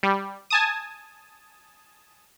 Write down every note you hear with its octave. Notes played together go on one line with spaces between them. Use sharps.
G3
G#5 A5 D#6